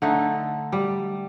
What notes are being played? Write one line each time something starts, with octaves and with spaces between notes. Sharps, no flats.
D3 A3 D#4
G3